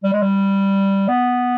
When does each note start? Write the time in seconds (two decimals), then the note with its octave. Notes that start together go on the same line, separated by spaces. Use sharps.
0.04 G3
0.13 G#3
0.22 G3
1.08 B3